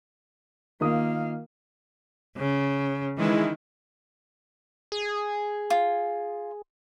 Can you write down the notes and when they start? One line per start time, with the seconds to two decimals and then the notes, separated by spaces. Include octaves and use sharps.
0.81 D#3 A#3 F4 F5 D#6
2.37 C#3
3.18 D#3 E3 G#3 E4
4.92 G#4
5.70 F4